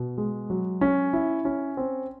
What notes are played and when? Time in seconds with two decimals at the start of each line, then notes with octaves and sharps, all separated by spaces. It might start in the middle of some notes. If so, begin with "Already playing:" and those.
Already playing: B2
0.18 G#3
0.50 F#3
0.81 C#4
1.13 E4
1.45 C#4
1.77 C4